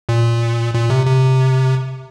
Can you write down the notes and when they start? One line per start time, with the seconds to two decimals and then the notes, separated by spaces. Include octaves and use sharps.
0.09 A#2
0.74 A#2
0.90 C3
1.06 C3